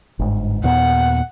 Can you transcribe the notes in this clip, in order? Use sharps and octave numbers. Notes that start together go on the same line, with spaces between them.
G1 G#2
D#2 A#2 B3 F#5